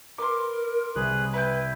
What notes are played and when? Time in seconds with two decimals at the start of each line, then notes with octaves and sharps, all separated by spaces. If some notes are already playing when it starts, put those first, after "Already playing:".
0.18 A#4 B4 C6 D6
0.96 C2 G#4 B4 F#6
1.33 E4 B4 G5 B5